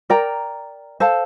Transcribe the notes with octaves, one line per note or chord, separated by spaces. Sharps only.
A#4 D5 G5 A#5
A4 C5 F5 A5